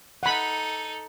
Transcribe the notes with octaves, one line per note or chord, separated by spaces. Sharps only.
D#4 A4 F#5 B5